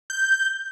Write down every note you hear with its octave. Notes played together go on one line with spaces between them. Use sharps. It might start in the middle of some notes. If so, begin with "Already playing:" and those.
G6